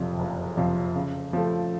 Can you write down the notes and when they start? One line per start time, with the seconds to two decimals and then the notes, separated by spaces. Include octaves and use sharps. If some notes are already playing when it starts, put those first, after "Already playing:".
Already playing: F#1 F2 C3 F3
0.19 F#1
0.57 F2 C3 F3
0.95 C#3
1.33 F3 A3